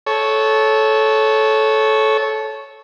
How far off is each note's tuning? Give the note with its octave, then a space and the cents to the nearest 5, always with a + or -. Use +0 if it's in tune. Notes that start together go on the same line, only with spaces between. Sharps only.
A4 -15 C#5 +0